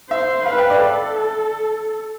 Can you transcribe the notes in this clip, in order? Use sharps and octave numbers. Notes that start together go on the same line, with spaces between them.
C5 E5
B4 F5
G5
D5
A4